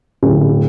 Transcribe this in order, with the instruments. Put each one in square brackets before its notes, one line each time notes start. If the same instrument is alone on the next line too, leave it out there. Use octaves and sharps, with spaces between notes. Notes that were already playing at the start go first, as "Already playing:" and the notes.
[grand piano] D1